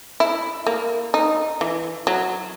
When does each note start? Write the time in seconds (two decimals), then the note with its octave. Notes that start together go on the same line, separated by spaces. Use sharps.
0.20 E4
0.67 A#3
1.14 D#4
1.61 E3
2.07 F#3